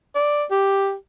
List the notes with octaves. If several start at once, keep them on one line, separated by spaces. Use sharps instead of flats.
D5
G4